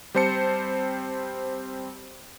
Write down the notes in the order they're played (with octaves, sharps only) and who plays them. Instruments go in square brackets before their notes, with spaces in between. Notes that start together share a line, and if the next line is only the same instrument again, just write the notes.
[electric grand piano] G3 C4 C5 A5 C#7